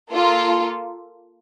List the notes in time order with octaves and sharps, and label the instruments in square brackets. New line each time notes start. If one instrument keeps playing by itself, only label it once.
[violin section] A#3 F4 A4